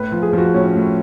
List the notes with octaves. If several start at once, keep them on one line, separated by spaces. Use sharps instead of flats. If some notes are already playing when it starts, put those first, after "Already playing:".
Already playing: A2 B4
F3
G#4
F3 F#4
A2 C#4
A2